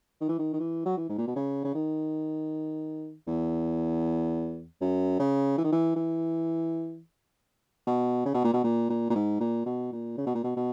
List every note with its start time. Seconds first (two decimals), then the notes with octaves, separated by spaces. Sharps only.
0.21 D#3
0.29 E3
0.39 D#3
0.53 D#3
0.60 E3
0.85 F#3
0.97 E3
1.09 G#2
1.18 A#2
1.27 B2
1.36 C#3
1.64 C#3
1.75 D#3
3.27 E2
4.81 F#2
5.19 C#3
5.58 E3
5.64 D#3
5.72 E3
5.96 E3
7.87 B2
8.25 C#3
8.34 B2
8.44 A#2
8.53 B2
8.64 A#2
8.89 A#2
9.10 A#2
9.15 G#2
9.40 A#2
9.66 B2
9.92 A#2
10.17 C#3
10.26 B2
10.35 A#2
10.44 B2
10.56 B2